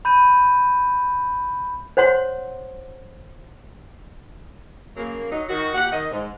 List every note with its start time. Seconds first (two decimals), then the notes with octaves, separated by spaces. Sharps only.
0.05 B5 G6 D#7
1.97 C5 C#5 F#5 C6
4.97 C#3 F#3 A#3
5.30 F#3 D#4
5.49 D#3 F#4
5.74 A#2 G4 F#5
5.92 D#3 D#5
6.12 G#2